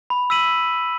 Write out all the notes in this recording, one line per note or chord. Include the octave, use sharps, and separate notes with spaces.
B5
E6 B6 D#7 F#7